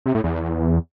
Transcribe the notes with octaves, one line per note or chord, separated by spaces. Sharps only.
C3
A2
E2